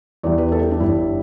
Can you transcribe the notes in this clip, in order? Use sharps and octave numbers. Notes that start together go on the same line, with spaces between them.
E2 E3 G3 D5
B4
A4
G4
D4
G1 G2 G3 E4